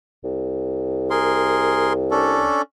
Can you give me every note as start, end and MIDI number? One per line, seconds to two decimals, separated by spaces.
0.24 2.49 36
1.10 1.93 68
1.10 1.93 70
1.10 1.93 84
2.11 2.62 61
2.11 2.62 62
2.11 2.62 69